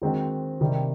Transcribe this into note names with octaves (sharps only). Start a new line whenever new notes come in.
D#3 G#3 C4 D#4 F#4
C3 D#3 G3